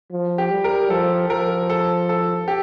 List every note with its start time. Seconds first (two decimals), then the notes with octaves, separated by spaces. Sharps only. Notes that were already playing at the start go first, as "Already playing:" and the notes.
0.12 F3
0.38 G4
0.51 G3
0.64 A#4
0.90 F3 A4
1.30 F3 A#4
1.70 A4
2.09 A4
2.48 G4